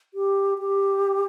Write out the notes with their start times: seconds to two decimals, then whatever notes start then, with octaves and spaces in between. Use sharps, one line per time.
0.14 G4
0.59 G4